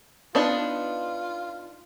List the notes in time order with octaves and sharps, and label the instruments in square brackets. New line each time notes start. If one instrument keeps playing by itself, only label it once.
[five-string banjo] B3 D4 D#4 [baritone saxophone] F4